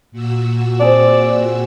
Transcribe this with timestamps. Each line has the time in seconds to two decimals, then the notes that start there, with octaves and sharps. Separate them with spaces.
0.12 A#2 F#4 E6
0.80 C4 G#4 D5